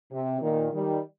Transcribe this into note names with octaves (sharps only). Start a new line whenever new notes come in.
C3
A#2 D#3
D#3 G3